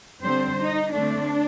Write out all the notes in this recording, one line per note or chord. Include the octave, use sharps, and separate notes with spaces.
D3 G3 C4 C5
D#4
D3 A3 C4 D4